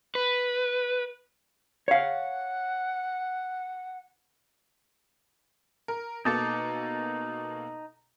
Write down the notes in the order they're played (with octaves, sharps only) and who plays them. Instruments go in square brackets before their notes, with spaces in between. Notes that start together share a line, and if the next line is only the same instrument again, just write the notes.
[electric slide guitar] B4
[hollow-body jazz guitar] C#5 F5 [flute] F#5
[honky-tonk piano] A#4
[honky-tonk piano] B2 A#3 A4 [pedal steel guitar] D#4 A5 D6